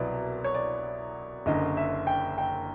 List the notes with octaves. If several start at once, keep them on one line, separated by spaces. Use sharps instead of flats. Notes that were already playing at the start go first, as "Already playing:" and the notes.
Already playing: C2 B2 F#3 B3 E4 D5
C#5
D5
F#1 F#2 D3 D#5
E5
G5
G5